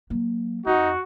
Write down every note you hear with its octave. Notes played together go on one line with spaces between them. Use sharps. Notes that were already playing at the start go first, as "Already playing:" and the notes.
F#3 A#3
F2 D#4 F#4